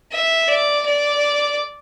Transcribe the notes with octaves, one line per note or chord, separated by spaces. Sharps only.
E5
D5
D5